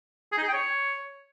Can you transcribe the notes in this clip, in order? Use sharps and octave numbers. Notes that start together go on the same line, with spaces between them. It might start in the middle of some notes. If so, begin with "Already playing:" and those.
G#4
D#4
G#4
G5
C#5